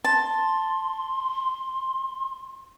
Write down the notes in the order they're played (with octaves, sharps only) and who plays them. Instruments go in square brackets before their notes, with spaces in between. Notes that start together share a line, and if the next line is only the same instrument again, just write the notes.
[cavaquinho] A5 [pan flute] C6